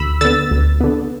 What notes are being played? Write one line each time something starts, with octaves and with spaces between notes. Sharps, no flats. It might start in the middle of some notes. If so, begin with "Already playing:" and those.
Already playing: D2 B5 E6
D3 B3 E6 A6
D2
D3 B3